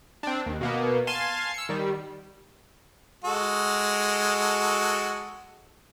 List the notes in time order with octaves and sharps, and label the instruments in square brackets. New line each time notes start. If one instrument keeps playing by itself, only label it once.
[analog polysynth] C4 D4
D#2
B2 A#3 B3
F5 G#5 A5 C6
E6 C#7
D#3 G3
[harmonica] G#3 F#4 A4